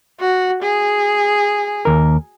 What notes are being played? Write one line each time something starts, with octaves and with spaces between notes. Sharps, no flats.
F#4
G#4
D#2 A#4